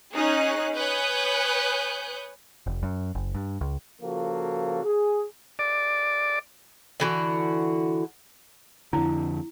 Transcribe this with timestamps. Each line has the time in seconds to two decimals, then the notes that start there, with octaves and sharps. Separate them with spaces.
0.13 C#4 D#4 G#4 F#6
0.77 B4 C#5 G#5 D#6 F#6 G6
2.66 F1
2.83 F#2
3.15 F#1
3.35 G2
3.61 C#2
4.02 C#3 F3 A#3 F#4 A4
4.84 G#4
5.59 D5
7.00 D3 E3 F#4
8.93 F2 D3 E4